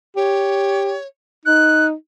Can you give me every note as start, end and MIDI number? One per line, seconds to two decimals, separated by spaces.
0.16 0.96 67
0.16 1.07 73
1.45 1.93 63
1.45 1.86 90